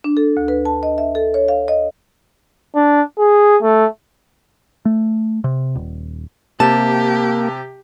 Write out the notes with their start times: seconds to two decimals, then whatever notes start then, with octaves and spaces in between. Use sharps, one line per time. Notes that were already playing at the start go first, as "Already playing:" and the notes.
0.04 D4
0.17 A4
0.37 D2
0.48 B4
0.65 A5
0.83 D#5
0.98 E5
1.15 A4
1.34 C#5
1.48 F5
1.68 D#5
2.75 D4
3.19 G#4
3.62 A3
4.85 A3
5.44 C3
5.75 D#1
6.60 C3 A#3 G4 A5